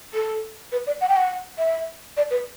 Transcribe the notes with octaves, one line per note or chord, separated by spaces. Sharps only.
A4
B4
D5
F#5
G5
F#5
E5
D5
B4